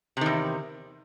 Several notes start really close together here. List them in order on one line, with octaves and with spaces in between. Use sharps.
C3 D#3 E2